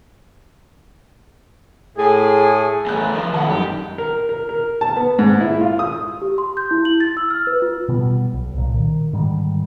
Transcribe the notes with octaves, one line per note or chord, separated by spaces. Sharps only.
A2 G#4
E2 A3 G#5 F#6
F3 D#4
B2 D#3 F#5 A5
F#2 G3 D#4 G4
A#4
A#4
A#4
A5
B3
G#2
E4
F4
D#6
G4
C6
G6
E4
F#7
A6
E6
F6
B4
F4
B2 G3 B3
B1
C2 A#2
D#3
G#2 D3 D#3 G3